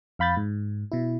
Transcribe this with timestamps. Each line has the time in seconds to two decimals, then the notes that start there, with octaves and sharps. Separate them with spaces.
0.19 F2 F5 B5 G6 A6
0.37 G#2
0.92 B2 E4